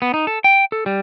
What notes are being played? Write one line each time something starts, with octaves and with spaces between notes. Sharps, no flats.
B3
D#4
A4
G5
A4
G3